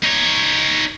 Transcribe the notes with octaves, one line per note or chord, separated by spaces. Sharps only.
D#4 C#5